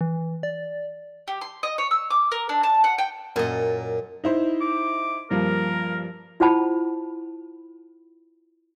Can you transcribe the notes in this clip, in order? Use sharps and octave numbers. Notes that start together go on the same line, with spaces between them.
E3
D5
G4
C6
D#5
C#5
E6
D6
A#4
D4
A5
F#5
G5
F#2 A#2 D#5
D#4 E4 C5
D6
G2 F3 A#3 A#4
E4 F4 C5 F#5 A5 B5